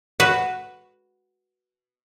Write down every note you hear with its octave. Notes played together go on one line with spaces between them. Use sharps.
F#4 B4